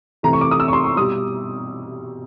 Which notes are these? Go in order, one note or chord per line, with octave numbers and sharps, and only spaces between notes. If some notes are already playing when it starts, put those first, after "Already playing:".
C3 E3 A3 A#5
C#6
D6
D#6
E6
C#6
C6
C#6
B2 G3 D#6